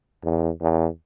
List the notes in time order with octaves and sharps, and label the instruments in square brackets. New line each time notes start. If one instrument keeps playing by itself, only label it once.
[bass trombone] E2
E2